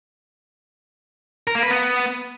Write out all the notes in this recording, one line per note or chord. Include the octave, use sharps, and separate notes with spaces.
A#4
A#3
B4
B3